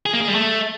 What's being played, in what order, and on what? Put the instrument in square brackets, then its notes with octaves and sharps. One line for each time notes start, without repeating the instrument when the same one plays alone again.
[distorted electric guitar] G#4
A#3
G#4
G3
A3